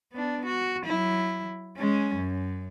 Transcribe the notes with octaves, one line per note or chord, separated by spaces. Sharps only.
B3 D4
F#4
F#3 E4
G#3 C#4
F#2